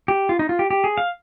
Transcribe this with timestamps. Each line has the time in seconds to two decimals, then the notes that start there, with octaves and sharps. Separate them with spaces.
0.08 G4
0.29 F4
0.39 D#4
0.49 F4
0.59 G4
0.71 G4
0.84 G#4
0.98 F5